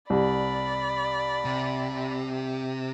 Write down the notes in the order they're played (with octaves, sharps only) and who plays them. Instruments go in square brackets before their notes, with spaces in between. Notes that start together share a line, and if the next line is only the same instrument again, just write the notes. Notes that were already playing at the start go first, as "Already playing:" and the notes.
[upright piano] C2 [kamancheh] D5 B5
[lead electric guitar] C3